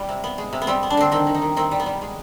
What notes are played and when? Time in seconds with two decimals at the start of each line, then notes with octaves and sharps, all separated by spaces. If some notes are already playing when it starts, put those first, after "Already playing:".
Already playing: G3
0.09 C3
0.24 B3
0.38 G#3
0.53 C3
0.62 B3
0.67 G3 C4
0.83 B3
0.90 D4
0.97 D3 C4
1.12 D#3 C4
1.27 D#3
1.34 D#4
1.42 D#3
1.56 D#3 C4
1.71 G3
1.80 B3
1.86 G3
2.02 G#3